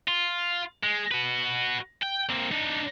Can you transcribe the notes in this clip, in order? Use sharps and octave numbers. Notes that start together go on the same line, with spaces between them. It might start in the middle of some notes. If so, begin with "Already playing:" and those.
F4
G#3
F#4 B4
G5
A#3 C4
D4 D#4